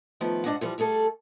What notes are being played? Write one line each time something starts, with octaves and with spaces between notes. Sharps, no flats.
D#3 F3 A3 B3
G#2 D4 D#5 F#5
E3 F3 G3
G3 A3 G#4 A4